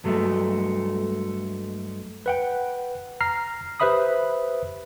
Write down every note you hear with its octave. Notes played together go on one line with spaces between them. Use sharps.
G2 F#3 G#3 A3
B4 F#5 G5
A#5 F6 C7
G4 B4 C5 E5 B5 D#6